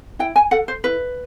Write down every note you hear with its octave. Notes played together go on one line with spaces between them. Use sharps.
E4 G5
G#5
A4 F#5
C5
E4 B4